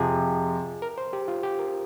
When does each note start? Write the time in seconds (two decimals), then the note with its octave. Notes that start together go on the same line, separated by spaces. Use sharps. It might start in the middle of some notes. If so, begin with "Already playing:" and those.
Already playing: F2 C3 F3 G#4
0.82 A#4
0.98 C5
1.13 G4
1.28 F4
1.43 G4
1.59 A#4